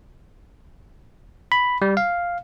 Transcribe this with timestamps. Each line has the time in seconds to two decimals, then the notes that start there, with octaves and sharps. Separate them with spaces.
1.52 B5
1.82 G3
1.97 F5